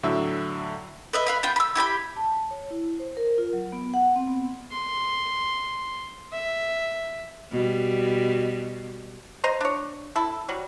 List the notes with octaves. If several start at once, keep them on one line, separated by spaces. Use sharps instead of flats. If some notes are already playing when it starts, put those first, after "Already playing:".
A2 D3 F#3 E5 E6
B4 D#5 E5
B4 F5 B5
B3 F4 G5
B5 E6
E4 G4 A5 B5
A5
C#5
E4
C5
A#4
F4
F#3
B3
F#5
C4
B3
C6
E5
B2 G3
C5 D#5 A#5 C6
D4 C#5
E4 A4
F#3 G3